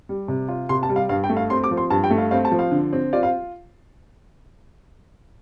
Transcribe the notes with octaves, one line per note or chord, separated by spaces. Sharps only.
G3
C3
F4
C3 C6
A5
G3
F5
G2 F5
G5
A3
F5
C4 C6
D6
F3
C6
G2 A5
G5
A3
F5
C4 F5
A5
F3
F5
D3
C4
F4 D5
F5